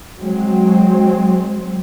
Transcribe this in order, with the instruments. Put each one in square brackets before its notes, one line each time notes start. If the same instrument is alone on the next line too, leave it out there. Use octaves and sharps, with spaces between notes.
[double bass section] F#3 G#3 C4